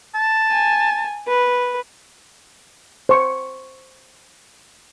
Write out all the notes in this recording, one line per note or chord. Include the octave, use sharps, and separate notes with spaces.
A5
G#5
B4
C5 C#6